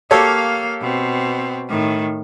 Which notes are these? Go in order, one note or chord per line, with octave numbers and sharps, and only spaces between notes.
A#3 G4 A4 C#5 F5
B2 C4
A2 D#3